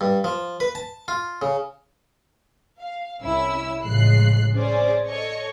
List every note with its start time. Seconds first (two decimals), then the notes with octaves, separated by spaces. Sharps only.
0.01 G2
0.24 F3
0.60 B4
0.75 A5
1.08 F4
1.42 C#3
2.78 F5
3.22 C2 C#4 E4 E6
3.83 A1 C#3 F3 G#3 F#6 C7
4.55 C#4 G#4 C5 D5
5.06 A4 C#5 D#5 C#6